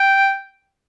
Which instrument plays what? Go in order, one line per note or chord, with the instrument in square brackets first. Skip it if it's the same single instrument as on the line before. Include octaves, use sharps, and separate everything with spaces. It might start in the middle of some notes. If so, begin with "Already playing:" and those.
Already playing: [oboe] G5